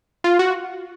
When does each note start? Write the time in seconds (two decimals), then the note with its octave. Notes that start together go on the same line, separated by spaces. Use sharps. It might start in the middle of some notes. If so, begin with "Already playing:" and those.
0.24 F4
0.39 F#4